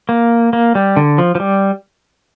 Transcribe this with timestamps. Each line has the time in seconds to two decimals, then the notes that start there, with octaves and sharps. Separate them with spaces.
0.09 A#3
0.53 A#3
0.75 G3
0.96 D3
1.18 F3
1.35 F3
1.40 G3